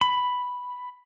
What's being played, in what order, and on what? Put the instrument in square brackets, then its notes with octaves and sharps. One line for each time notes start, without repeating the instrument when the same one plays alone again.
[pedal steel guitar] B5